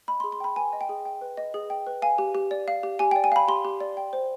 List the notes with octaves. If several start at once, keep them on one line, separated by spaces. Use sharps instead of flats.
D#5 B5
C6
G#4
C6
G5 B5
B4 G#5
D#5
G5
G#4
G5
B4
D#5
G#4
G5
B4
F5 G#5
G4
G4
D5
F5
G4
G4 G#5
G5
D5
G#5
F5 B5
G4 C6
G4
D5
G5
C5